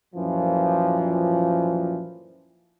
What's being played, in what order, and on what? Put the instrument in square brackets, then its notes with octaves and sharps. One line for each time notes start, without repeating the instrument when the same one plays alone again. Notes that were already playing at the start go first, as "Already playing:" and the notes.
[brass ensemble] F#2 A#2 E3 F3